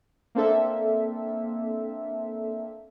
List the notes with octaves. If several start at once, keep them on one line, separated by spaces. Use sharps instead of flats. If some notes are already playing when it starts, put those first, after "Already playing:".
A#3 C4 D4 A4 E5